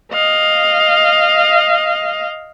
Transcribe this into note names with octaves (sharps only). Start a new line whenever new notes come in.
D#5 F5